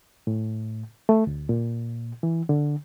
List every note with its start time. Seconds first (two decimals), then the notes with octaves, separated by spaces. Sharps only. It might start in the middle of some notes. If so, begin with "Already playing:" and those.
0.27 A2
1.09 A3
1.27 D2
1.49 A#2
2.23 E3
2.49 D3